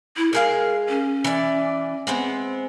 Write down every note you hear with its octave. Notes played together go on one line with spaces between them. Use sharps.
E4
G#3 G#4 A#4 F5
C#4
E3 D5
G#3 B3 C4